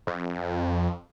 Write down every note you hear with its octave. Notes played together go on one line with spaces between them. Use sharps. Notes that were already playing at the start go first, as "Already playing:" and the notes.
F2